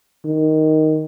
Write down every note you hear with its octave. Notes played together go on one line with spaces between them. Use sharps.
D#3